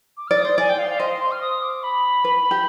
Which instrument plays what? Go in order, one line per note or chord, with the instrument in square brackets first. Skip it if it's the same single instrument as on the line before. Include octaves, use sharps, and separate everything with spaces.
[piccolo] D6
[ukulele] D5 [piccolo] F6
[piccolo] D#6
[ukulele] C5
[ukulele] D5 [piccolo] G#5
[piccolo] G5
F5
F5
[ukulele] C5 [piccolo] D#5
[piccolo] C6
F6
D#6
D6
B5
[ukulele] B4
G4